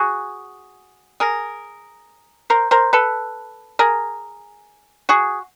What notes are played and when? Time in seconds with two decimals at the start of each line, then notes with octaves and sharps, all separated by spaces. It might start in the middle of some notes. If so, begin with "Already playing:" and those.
Already playing: F#4 G#4
1.20 G#4 A#4
2.50 A#4 C5
2.71 A#4 C5
2.93 A4 B4
3.79 G#4 A#4
5.09 F#4 G#4